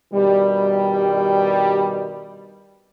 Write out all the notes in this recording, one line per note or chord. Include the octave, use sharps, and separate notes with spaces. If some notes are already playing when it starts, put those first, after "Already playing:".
G2 B2 D#3 G3